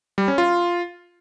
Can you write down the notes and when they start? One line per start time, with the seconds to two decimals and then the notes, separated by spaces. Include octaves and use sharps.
0.18 G3
0.28 C#4
0.38 F4